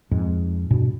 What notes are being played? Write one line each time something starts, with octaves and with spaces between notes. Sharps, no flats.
F2 G#2
G2 B2